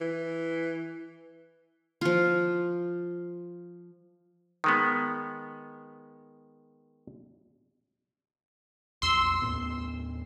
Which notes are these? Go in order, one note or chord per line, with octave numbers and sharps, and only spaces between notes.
E3
F3 F4
D#3 G#3 B3
B1 F2 C6 E6
D#2 A2 B3